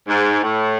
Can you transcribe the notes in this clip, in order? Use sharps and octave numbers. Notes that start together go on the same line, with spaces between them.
G#2
A2